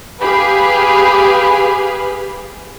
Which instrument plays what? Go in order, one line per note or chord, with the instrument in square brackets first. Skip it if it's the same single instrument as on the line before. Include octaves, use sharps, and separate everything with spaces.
[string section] G4 G#4 B4 F5 B5